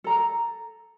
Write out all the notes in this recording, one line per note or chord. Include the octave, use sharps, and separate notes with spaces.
A4 A#5